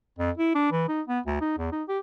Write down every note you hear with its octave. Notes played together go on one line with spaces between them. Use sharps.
F2
E4
D4
E3
D#4
B3
D2
D#4
E2
D#4
G4